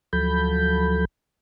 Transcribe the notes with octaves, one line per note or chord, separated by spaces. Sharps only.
D2 F3 F#3 A4 B5 G6